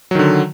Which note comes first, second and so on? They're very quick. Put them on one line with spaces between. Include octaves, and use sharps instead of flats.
F#3 D#3 D3